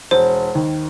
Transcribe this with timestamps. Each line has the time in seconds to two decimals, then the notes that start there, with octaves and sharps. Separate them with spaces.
0.11 E1 C5
0.55 D#2 D#3